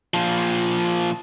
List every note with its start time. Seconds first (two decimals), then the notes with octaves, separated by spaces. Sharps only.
0.14 A#2 F3